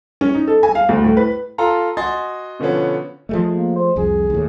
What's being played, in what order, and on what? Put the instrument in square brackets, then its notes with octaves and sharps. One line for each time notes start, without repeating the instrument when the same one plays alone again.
[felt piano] C#4
D#4
A4
G#5
F5
D2
A2
B4
[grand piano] F4 A4 A#5 C6
F#4 D#5 G#5 C6 A6
B2 D3 F3 B3 C#4
[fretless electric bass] F3 G#3 A3
[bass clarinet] A#3
C5
[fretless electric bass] C2 F2 [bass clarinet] G#4
[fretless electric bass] D#2 A2